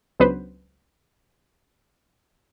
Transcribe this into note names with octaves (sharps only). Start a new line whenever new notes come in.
C#2 F#3 B3 D4 B4 C5